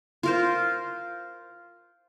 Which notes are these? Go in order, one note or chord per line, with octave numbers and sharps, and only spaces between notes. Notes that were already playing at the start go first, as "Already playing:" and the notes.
F4 A#4 C5